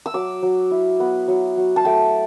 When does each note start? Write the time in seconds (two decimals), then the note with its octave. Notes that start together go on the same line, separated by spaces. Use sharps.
0.06 E6
0.14 F#3 D6
0.43 F#3
0.71 E4
1.00 B3
1.28 F#3
1.57 F#3
1.76 A5
1.85 A3 G5